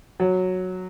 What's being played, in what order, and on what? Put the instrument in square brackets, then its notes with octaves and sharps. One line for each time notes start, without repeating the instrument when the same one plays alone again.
[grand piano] F#3